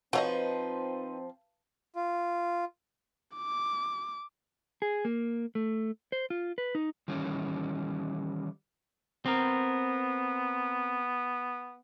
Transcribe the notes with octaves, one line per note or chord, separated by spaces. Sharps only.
F3 C4 D#4 F#4 B4 C#5 D#5
F4
D6
G#4
A#3
A3
C5
F4
B4
D#4
D#3 E3 G3 C#4
B3 C4 A#4